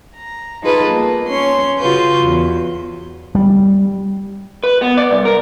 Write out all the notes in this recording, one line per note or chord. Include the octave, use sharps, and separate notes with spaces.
A#5
D#4 F4 G#4 A4 B4
A#3
C#4 C6
C#3 F4 F#4 B4 G6
E2
G3
B4
B3
D5
C2
A#4